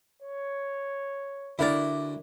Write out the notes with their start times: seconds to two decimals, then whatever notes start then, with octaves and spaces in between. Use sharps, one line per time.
0.22 C#5
1.59 D2 D4 E4 A#4 D5 A#5